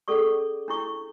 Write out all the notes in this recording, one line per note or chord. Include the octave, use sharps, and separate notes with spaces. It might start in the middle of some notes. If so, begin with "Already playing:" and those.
C#4 G#4 A4 D5 C#6
D4 E4 C#6